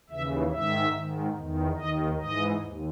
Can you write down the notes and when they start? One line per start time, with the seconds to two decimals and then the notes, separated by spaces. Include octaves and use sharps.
0.10 D#2 C#3 E3 E5
0.51 G#2 D#3 E5
0.94 G#2 D#3
1.36 E2 D#3
1.77 D#2 D#3 D#5
2.19 G#2 E3 D#5
2.60 D#2